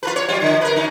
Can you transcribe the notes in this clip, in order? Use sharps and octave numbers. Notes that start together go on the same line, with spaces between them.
F4 A#4 B4
C#5
F#3 F4
D3
A#4 B4
F#2 D#4